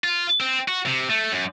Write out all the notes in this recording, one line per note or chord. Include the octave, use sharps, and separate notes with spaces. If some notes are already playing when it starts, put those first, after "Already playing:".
F4
C4
F#4
C3
A3
F#2